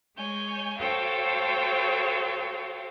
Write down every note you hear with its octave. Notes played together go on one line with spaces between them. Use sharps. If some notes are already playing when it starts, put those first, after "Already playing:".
G#3 C#5 G#5 G6
F#4 A4 C5 C#5 F5 G5